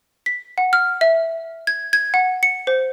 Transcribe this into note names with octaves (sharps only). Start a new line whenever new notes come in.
B6
F#5
F6
E5
G#6
G#6
F#5
C#7
C5